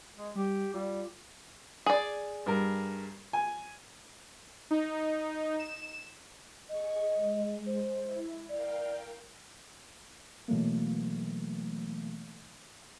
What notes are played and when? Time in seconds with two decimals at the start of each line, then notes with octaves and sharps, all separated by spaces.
0.18 G#3
0.35 G3 G4
0.74 G3 F4
1.86 G#4 D5
2.46 G2 A#4
3.33 G#5
4.71 D#4
5.59 E7
6.69 G#4 D#5 C#6
7.16 G#3
7.66 C5
8.03 E4
8.49 A#4 D5 F5 G5
10.48 B2 E3 F#3 A3 A#3